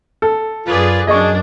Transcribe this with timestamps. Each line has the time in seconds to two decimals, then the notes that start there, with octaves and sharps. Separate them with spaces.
0.22 A4
0.66 F#2 F4 G#4 B4 D5
1.07 F#2 D4 G#4 D#5 C#6